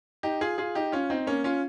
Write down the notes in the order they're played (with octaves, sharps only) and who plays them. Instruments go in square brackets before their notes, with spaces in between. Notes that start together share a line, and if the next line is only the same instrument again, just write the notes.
[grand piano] D#4 G4
F4 G#4
F4 G#4
D#4 G4
C#4 F4
C4 D#4
A#3 C#4
C#4 F4